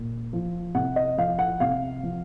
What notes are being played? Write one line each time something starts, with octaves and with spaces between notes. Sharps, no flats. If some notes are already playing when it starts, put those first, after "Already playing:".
Already playing: A#2
F3
C3 F#5
D#5
F3 F5
F#5
C3 F5
F3